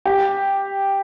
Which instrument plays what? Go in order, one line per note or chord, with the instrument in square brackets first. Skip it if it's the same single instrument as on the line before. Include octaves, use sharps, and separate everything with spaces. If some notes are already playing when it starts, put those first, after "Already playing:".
[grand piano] G4